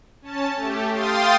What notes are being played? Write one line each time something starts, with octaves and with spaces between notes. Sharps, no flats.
C#4 A5
A3 G4
F5 G5 C6 D#6 A6